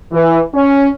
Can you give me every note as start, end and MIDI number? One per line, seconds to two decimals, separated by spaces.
0.11 0.39 52
0.53 0.87 61